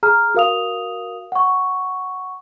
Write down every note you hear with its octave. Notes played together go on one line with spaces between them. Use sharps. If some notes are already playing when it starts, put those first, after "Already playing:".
G#4 A#5 F6
F#4 A#4 F5 D#6 F7
F#5 C#6